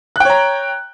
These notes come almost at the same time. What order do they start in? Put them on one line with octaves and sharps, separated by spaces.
F#6 G5 C#5 A#5